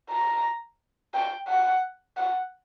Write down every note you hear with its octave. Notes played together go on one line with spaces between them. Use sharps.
A#5
G5
F#5
F#5